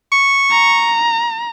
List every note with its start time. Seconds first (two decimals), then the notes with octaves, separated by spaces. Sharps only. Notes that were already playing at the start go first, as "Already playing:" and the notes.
0.12 C#6
0.51 A#5